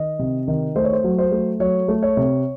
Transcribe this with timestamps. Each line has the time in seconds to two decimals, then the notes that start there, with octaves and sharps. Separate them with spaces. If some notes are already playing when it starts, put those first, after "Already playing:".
Already playing: D#3 D#5
0.19 C3
0.48 D#3
0.76 A3 C5
0.84 C#5
0.93 C5
1.04 F#3
1.18 C5
1.32 A3
1.60 F#3 C#5
1.88 A3
2.03 C#5
2.17 C3